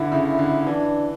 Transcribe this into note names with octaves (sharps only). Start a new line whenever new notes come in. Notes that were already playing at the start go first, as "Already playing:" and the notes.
Already playing: D3 E3 E4
C#3
D3
E3 D4